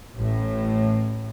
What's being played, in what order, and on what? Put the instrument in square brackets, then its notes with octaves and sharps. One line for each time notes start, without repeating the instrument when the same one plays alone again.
[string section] A1 A2